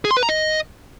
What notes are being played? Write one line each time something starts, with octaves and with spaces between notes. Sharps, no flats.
G#4
C6
B4
A#5
D#5